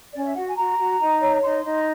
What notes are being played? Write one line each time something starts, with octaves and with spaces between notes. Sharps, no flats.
C#4 D5
E5
F#4 F#5
G#5
F#4 A#5
F#4
D#4
C#5
D#4 C6
D#4